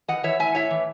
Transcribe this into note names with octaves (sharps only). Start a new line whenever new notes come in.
E3 D#5 F#5
E3 C#5 E5
A2 E5 G#5
A2 C#5 E5
E3